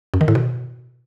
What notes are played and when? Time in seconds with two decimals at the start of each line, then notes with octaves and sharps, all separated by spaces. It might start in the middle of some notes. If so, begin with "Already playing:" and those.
0.14 F#2
0.21 D#3
0.28 A2
0.35 B2